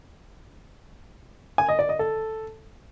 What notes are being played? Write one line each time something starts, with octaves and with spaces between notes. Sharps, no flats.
G#5
D#5
D5
D#5
A4